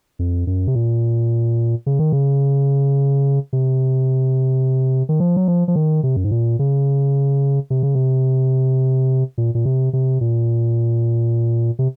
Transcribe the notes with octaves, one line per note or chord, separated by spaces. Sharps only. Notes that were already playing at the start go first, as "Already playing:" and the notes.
F2
F#2
C3
A#2
C#3
D#3
C#3
C3
D#3
F3
F#3
F3
F3
D#3
C3
F#2
G#2
A#2
C#3
C3
C#3
C3
A#2
A#2
C3
C3
A#2
C3